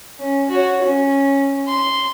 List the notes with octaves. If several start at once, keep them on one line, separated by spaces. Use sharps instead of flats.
C#4
F#4 C#5
C#4
C6